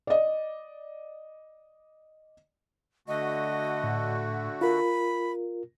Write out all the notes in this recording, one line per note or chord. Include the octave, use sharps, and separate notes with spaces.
D5 D#5
D3 A3 F#4 D#5
A2
F4 A#4 B5